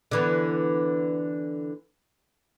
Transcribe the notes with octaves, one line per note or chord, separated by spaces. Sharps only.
D3 E3 B3